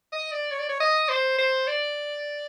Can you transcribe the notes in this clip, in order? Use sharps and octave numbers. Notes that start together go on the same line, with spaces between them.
D#5
D5
C#5
D5
C#5
D#5
C5
C5
D5